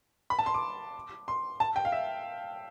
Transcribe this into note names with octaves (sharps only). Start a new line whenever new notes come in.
B5
A5
C6
D6
C6
A5
G5
F5
E5